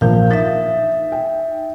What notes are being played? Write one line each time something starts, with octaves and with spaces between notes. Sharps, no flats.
A#1 A#4 F5 G6
D#4 E5 A6 B6
G5